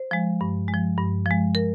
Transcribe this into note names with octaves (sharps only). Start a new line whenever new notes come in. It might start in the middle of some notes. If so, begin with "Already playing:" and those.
Already playing: C5
F3 G#3
G2
G#3
F3
G2
F3
G#3
A#4